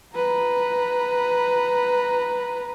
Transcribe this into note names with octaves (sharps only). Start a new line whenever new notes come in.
B4 A#5